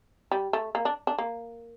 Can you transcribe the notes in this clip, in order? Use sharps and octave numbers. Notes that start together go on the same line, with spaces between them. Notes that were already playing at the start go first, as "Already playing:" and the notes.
G3
A3
A#3
D4
D4
A#3